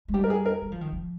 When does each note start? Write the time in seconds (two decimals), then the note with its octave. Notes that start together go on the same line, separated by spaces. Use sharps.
0.08 G#3
0.14 G3 G4
0.24 A#4
0.30 G#4
0.46 A#4
0.62 G3
0.72 F3
0.81 D#3
0.92 F3